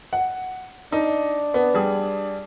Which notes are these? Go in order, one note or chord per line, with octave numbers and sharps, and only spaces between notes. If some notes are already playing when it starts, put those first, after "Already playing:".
F#5
D4 D#4
B3
G3 G#4